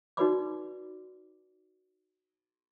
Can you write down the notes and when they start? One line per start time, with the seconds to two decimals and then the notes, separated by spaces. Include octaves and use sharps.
0.17 D#4 F#4 B4 D5 B5 D6